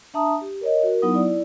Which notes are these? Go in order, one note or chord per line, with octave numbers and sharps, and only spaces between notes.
D4 E5 A5 A#5 D#6
G4
A#4 C#5 D#5
F#4 A#4
F#3 B3 D#4 E4 D#6
E4 D5